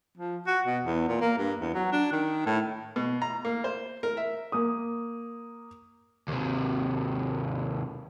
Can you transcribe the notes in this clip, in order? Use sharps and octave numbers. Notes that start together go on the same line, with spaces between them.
F3
F#4
B2
E2
A#2
A#3
G2
E2
F#3
D4
D#3
A2
B2
A#5
A#3
C5
A#4
E5
A#3 D#6
D#2 C3